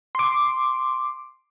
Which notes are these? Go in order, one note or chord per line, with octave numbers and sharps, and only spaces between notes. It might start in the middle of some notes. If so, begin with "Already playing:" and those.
C6 D6